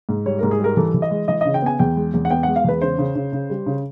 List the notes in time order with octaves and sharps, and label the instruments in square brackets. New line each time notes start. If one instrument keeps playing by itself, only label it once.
[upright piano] G#2
G3 C#5
G#2 A#4
G#4
G3 A#4
E3 A4
E3
D#5
G#3
E3 D#5
C#3 D#5
G5
B3 G#5
E2 G5
G#3
E2
F#5
B3 G5
G#3 F#5
F5
E2 B4
C#3 C5
C#3
C#3
C#3
G3
C#3